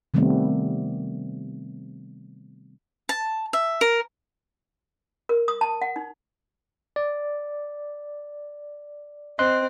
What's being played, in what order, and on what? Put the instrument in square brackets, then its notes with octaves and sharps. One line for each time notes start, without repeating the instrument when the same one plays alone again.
[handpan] C3 D#3 G3 A3 B3 C4
[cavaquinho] A5
E5
A#4
[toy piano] A#4
D#6
A5
F#5
D#4
[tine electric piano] D5
[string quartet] C4 [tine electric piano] D#5 C6 F#6